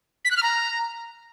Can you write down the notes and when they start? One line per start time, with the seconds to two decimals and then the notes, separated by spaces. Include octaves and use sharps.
0.25 B6
0.31 F#6
0.37 F6
0.43 A#5